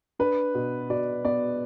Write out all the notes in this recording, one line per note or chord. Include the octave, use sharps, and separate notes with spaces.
D4 B4
B2
B2 D5
B3 D5